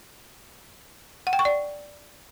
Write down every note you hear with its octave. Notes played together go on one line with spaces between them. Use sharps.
F#5
G5
C#6
D5